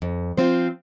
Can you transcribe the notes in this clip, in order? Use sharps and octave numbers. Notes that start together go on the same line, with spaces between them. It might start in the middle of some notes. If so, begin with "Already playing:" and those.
F2
F3 C4 F4 C5